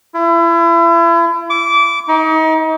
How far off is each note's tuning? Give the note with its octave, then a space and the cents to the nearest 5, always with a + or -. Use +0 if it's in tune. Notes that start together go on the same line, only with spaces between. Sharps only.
E4 +35
D6 -20
D#4 +35